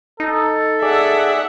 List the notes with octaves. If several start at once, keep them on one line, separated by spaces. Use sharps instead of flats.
D#4 A4
G#4 D5 E5 F#5